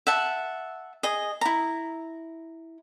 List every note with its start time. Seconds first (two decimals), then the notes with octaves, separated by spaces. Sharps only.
0.07 E5 F#5 A5
1.03 G#4 D#5
1.41 E4 A#5